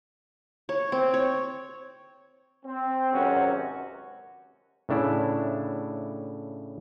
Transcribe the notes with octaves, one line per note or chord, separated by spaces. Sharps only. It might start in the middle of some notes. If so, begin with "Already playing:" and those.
C#5
C4
C#5
C4
G#1 C#2 F#2 C3 C#4 F#4
A2 C#3 D4 E4